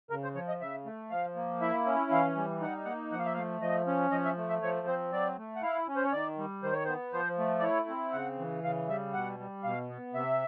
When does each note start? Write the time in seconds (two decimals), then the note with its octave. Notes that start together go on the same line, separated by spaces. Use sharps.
0.10 C#3 A#4
0.24 C5
0.35 F3 C#5
0.48 D#5
0.61 C#3 E5
0.85 A3
1.10 F3 F5
1.36 A#3
1.61 E4 E5
1.86 C#4
2.11 E3 F5
2.36 G3
2.61 D#4 F#5
2.85 A#3 F#5
3.12 F3 F#5
3.19 F5
3.26 E5
3.34 A3 F5
3.61 F3 D#5
3.87 C#4
4.11 F3 D#5
4.25 E5
4.37 A3
4.49 E5
4.62 F3 C#5
4.87 C4 C5
5.12 F#3 D5
5.38 A3
5.56 F#5
5.62 E4 F5
5.88 C#4
5.96 C5
6.05 C#5
6.12 D#3 D5
6.38 G3
6.63 D#3 C5
6.73 C#5
6.85 B3 C5
7.13 F3 C5
7.38 A3
7.59 D5
7.63 E4 C#5
7.89 C4
8.13 C#3 F#5
8.39 E3
8.64 C#3 F5
8.89 G3 E5
9.13 B2 F#5
9.39 G3
9.64 B2 F5
9.90 B3
10.14 C3 E5